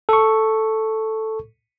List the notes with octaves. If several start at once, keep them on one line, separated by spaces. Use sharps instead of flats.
A4 C#6